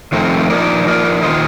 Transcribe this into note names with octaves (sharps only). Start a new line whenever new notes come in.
F2 D#3 A3 C4
F3 A#3 D#4 A#4 D5
F3 A#3 D#4 A#4 D5
D#3 A#3 F4 C5 D#5